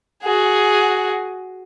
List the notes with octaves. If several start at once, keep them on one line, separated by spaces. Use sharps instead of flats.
F#4 G#4